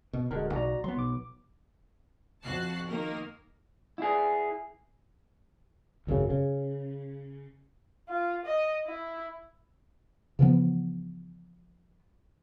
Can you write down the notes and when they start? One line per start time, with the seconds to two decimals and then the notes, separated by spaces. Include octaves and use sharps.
0.13 B2
0.31 D1 D3 G#3 F#4 A#4
0.53 B1 F#4 D5 A#5
0.84 F#3 B3 C6
0.96 B1 D6
2.44 F2 F#4 A5 F#6 C7
2.88 D#3 A#3 A#4
3.98 E4 G#4
6.07 G#1 F#2 A2 C#3
6.30 C#3
8.09 F4
8.45 D#5
8.86 E4
10.39 C#3 E3 F3 B3